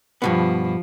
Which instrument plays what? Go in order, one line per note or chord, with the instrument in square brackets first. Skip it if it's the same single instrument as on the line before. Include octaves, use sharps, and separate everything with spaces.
[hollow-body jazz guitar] G2 B2 B3 [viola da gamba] F3